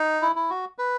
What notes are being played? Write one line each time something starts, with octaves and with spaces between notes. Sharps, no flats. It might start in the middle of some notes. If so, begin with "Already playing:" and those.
Already playing: D#4
E4
E4
F#4
B4